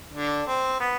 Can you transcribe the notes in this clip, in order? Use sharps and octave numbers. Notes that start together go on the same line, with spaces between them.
D3 D4
C4
B3